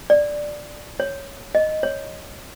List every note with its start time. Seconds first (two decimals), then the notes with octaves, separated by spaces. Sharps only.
0.10 D5
1.00 C#5
1.55 D#5
1.83 C#5